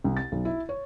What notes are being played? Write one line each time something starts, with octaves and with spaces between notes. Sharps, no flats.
C2
A6
B1
E4
C#5